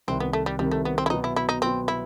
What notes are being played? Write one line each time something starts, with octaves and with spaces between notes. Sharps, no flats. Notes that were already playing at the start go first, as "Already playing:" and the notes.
C2 C3 D#3 C4
B3
A3
G3
C2 C3 D#3 G3
A3
B3
C4
E4
B2 F#3 B3 D#4
E4
E4
D#4
B2 F#3 B3 C4
E4